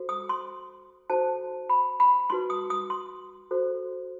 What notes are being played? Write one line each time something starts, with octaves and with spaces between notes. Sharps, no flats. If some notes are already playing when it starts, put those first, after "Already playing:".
Already playing: F#4 A4 C5
D#6
C6
D#4 F#4 A4 C5 A5
B5
B5
D#4 F#4 B4 C6
D#6
D#6
C6
F#4 A4 C5